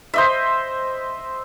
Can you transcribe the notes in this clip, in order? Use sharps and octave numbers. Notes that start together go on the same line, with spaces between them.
C5 D#5 E5